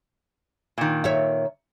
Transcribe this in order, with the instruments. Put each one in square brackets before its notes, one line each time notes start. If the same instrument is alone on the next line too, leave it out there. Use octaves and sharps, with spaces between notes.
[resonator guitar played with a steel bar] A#2 D#3
[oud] C#5 E5